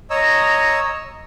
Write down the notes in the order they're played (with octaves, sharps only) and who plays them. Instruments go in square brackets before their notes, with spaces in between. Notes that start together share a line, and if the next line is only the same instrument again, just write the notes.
[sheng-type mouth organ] C#5 D#5 A#5 E6